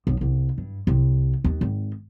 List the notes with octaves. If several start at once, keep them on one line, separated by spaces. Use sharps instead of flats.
B1
C2
G2
C2
D#2
G#1